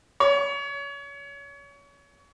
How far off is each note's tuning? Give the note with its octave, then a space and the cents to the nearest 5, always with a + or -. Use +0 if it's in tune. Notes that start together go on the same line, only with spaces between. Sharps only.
C#5 +30